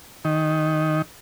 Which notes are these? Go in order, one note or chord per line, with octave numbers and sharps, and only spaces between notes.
D#3